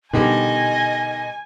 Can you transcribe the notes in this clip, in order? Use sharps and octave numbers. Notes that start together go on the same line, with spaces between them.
B2 D3 D#3 G3 D#5 G#5